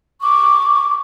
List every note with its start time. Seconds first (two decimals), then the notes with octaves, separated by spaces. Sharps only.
0.22 C#6 D6